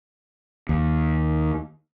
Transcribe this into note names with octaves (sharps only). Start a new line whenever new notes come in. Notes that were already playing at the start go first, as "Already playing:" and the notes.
D#2